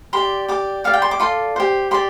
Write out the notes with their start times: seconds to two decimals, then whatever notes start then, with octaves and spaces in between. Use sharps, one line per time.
0.13 G4 D5 C6
0.48 G4 D5 D6
0.84 G4 D5 F5
0.94 G5
1.02 C6
1.11 D6
1.20 F4 A4 D5 C6
1.56 G4 C5
1.91 G4 D5 C6